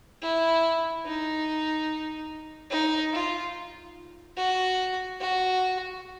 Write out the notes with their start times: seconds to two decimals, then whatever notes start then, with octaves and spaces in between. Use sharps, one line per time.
0.22 E4
1.06 D#4
2.70 D#4
3.12 F4
4.37 F#4
5.21 F#4